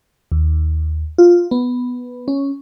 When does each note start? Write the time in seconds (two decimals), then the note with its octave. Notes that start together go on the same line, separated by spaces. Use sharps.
0.32 D#2
1.18 F4
1.51 B3
2.28 C#4